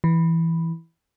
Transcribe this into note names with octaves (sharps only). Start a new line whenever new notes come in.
E3